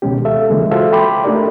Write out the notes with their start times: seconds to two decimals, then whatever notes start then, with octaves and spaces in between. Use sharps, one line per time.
0.02 C#2 B2 D#3 G#3 C#4 G4
0.25 A4 E5 F5
0.50 D#2 C#3 E3 F3 G#3 A#3
0.71 F4 F#4 A4 C5 E5 F5
0.92 E5 G5 B5 C6 D6
1.24 A3 D4 D#4 G4 A#4 D5